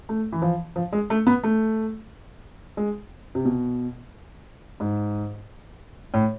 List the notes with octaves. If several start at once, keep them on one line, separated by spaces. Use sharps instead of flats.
A3
E3
F3
F3
G#3
A3
B3
A3
G#3
C3
B2
G#2
A2